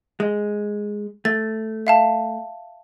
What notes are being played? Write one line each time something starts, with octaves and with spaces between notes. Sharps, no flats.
G#3
A3 A6
E5 F5 A5